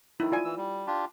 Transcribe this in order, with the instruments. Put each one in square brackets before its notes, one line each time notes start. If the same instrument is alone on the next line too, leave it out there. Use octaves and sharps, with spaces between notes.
[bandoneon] D#3 F#3 [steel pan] D#4 E4
[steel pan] F4 D5 G#5
[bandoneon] E3 E6
G3
D4 F4 G4